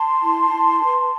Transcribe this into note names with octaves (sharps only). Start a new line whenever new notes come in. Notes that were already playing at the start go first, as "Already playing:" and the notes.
Already playing: A5 C6
E4
E4
B4